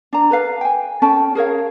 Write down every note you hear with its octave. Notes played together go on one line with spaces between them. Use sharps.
D4 A#5
A4 B4 F5
G5 G#5
C#4 A4 G5 A5
G#4 A#4 C#5 F5